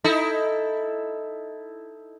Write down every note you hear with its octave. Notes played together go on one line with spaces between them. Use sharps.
D#4 E4 A4